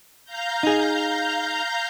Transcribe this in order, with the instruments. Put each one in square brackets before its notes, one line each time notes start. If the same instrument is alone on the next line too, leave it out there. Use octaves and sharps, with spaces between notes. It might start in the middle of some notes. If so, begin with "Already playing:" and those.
[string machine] F5 A#5 G6
[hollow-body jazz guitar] D#4 G#4